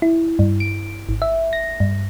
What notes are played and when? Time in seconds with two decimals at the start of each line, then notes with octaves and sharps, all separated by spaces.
0.02 E4
0.39 G2
0.60 D7
1.09 G#1
1.22 E5
1.53 A#6
1.80 G2